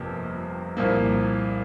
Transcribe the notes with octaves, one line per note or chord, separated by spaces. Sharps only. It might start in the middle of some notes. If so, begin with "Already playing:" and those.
Already playing: G1 F2 C3 A#3
C2 A#2 F3 A#3